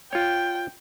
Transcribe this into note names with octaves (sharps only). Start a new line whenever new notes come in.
F4 C#5 G5